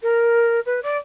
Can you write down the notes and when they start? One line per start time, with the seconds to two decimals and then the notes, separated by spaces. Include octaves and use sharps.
0.02 A#4
0.66 B4
0.82 D5